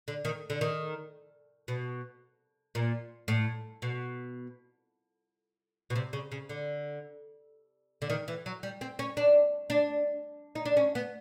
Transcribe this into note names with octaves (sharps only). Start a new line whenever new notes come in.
D3
D#3
D3
D#3
B2
A#2
A2
B2
B2
C3
C#3
C#3
D3
D3
D#3
E3
F#3
G3
C4
C#4
D4
D4
D#4
D4
C#4
B3